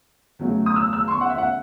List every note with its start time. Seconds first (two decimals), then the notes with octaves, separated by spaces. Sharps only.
0.39 E2 C#3 F#3 A3
0.66 D#6
0.76 E6
0.93 E6
1.08 C6
1.11 C#6
1.21 F#5
1.30 E5
1.38 F#5